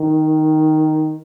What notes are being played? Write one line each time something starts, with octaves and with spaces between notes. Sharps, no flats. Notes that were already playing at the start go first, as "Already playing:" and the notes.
Already playing: D#3